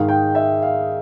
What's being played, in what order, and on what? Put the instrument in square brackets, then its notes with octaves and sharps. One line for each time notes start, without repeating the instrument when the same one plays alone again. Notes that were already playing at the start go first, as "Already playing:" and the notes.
Already playing: [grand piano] G#2 D#3 G#3 F5
G5
E5
F5